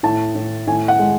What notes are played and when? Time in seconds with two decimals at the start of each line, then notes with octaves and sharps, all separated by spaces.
0.03 A2 A5
0.35 A2
0.67 A2 G#5
0.88 F#5
0.99 G#3